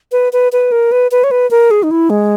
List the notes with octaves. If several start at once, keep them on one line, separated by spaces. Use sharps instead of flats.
B4
B4
B4
A#4
B4
B4
C#5
B4
A#4
G#4
D#4
E4
G#3